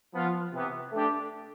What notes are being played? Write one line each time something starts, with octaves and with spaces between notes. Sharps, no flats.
F3 B3 F4
C3 E3 B3
A3 D4 G4